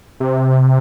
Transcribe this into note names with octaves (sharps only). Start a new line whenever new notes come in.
C3